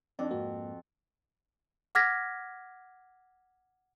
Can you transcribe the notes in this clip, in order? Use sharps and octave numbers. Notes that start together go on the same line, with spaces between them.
F2 C4 D4 D#4 D5
G#2 A#3 F#4
F#5 D6 F6 G#6 A#6 B6